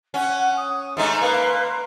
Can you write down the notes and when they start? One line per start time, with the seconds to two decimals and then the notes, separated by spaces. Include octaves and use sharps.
0.14 C#4 F#5
0.57 D#6
0.97 G#2 A3 D#4 C6
1.22 A#3 B4